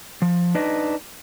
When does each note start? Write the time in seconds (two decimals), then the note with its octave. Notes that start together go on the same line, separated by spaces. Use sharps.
0.22 F3
0.55 D4 D#4 B4 D#5